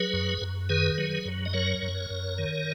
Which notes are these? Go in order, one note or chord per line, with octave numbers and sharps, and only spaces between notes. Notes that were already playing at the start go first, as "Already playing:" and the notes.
Already playing: F#3 G#4 B4
F#2
F#2
D#3 G#4 B4
F#3
F#2
D#5
F#3 A#4 C#5
F#2
F#2
D#3